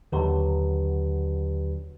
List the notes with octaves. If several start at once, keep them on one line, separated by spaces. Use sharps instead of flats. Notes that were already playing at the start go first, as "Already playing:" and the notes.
D#2 D3 F#3 G4 B4